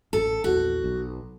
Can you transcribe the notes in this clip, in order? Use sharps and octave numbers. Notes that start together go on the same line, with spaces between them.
A1 A4
A#1 E2 F#4
B1